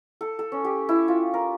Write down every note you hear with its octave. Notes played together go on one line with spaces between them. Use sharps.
A4
A4
C#4
G4
E4
F4
A#4